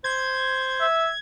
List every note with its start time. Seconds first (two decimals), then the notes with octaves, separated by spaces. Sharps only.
0.04 C5 G#6
0.81 E5